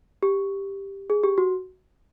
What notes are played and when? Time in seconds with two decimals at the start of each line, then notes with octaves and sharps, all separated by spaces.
0.23 G4
1.10 G#4
1.24 G4
1.38 F#4